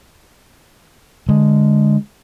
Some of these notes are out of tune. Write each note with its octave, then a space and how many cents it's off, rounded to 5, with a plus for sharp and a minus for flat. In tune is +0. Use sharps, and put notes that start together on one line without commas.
D3 +0 G#3 +0